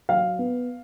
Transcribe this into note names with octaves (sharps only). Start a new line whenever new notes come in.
F#3 F5
B3